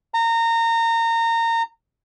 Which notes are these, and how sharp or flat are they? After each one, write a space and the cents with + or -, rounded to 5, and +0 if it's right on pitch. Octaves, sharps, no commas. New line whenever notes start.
A#5 -25